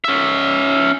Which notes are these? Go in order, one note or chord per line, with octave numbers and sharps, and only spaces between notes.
C#4 E5